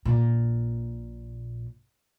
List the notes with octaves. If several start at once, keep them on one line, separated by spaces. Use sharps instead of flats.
A#1 A#2